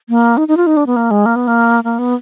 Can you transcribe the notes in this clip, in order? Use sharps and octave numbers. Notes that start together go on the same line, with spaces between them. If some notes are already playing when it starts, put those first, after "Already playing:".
A#3
D#4
D#4
F4
D#4
D4
B3
A#3
G#3
A#3
B3
A#3
A#3
B3